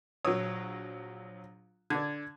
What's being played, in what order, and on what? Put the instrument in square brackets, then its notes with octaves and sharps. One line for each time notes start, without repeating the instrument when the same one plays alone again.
[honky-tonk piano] A#1 F#3 [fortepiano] C#5 D#6 E6
[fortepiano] D3 D4 [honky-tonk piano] G#6